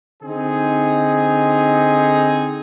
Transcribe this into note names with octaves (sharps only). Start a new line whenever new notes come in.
D3 C4 D#4 G#4